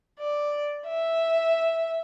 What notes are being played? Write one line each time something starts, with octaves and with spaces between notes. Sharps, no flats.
D5
E5